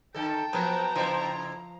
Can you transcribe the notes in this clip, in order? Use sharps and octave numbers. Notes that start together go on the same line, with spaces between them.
D3 A4 G5 A5
F3 F#3 A#3 B3 A#4 A#5
C#3 F3 C4 E4 C5